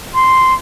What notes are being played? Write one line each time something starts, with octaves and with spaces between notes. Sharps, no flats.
C6